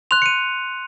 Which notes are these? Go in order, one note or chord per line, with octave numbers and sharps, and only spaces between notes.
C6 F#6 F7
C#7
D#7